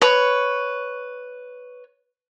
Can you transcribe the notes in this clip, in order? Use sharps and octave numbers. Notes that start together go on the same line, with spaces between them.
B4 C#5